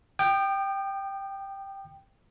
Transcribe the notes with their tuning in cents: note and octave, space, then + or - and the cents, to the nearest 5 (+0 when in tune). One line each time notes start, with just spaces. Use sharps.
G5 +0 D#6 -40